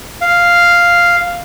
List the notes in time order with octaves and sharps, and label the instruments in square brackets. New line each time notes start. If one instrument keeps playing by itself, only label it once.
[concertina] F5